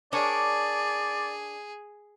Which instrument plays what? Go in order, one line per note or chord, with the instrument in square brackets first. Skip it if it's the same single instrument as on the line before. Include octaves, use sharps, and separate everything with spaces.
[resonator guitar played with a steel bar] D4 A#4 C#5 [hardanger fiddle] G#4 [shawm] D5